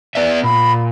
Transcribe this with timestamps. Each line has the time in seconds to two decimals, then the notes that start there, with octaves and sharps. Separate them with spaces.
0.15 B3 B4 D5 E5
0.44 A#2 B5